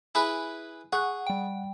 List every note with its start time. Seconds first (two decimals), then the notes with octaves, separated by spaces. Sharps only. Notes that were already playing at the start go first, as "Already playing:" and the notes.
0.15 E4 G#4 B4 G#5 B5
0.93 G#4 F#5 C#6 F#6
1.27 G3 G5